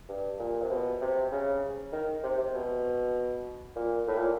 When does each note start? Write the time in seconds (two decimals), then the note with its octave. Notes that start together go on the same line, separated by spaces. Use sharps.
0.09 G2
0.39 A#2
0.62 C3
0.70 B2
1.01 C3
1.32 C#3
1.92 D#3
2.23 C3
2.38 C3
2.54 B2
3.76 A#2
4.08 A2
4.17 A#2